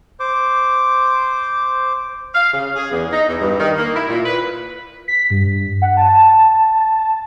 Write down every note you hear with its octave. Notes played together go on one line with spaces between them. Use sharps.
C5 D6
F5
C#3
G#4
E2
D#4
E2
G2
D#3
A#3
E4
A#2
B4
B6
G2
F#5
A5